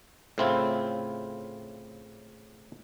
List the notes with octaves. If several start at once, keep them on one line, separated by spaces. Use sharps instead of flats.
A2 C#3 C4 E4 F4